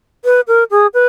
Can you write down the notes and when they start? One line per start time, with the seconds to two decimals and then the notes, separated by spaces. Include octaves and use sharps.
0.25 B4
0.48 A#4
0.71 G#4
0.94 B4